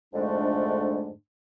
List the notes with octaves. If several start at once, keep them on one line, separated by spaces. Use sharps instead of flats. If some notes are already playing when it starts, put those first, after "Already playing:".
F2 G#2 D3 G#3 A3 D4